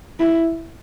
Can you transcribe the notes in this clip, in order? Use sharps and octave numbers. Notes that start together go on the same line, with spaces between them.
E4